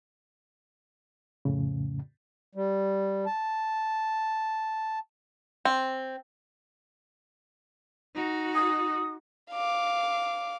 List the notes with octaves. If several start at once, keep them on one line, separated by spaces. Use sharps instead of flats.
F2 A2 C#3
G3
A5
C4
D#4 F#4
D#6
F5 D6